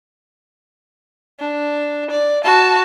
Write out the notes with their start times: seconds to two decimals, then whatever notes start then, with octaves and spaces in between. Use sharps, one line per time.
1.40 D4
2.11 D5
2.44 F#4 A5